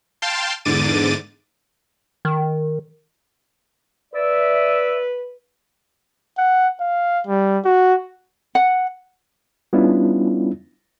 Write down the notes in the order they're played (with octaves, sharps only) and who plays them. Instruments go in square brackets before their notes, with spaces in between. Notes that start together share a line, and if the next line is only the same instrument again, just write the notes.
[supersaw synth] F5 G5 A5 C6
E2 G#2 D3 D6 A6 D#7
[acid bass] D#3
[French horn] B4 [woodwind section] D5 E5
[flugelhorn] F#5
F5
G3
F#4
[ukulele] F#5
[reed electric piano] G3 B3 C#4 D4 E4 F4